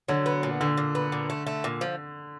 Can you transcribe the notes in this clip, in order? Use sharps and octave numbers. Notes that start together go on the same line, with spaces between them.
D3 F#3
B3
A#2
A#2 D3
A#2
B3
A#2
A3
A3
A#2
F3